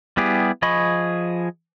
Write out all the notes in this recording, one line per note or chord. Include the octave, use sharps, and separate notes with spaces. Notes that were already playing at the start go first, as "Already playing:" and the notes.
G3 B3 E4 G4 G#4
F3 G#4 D#5 B5 C#6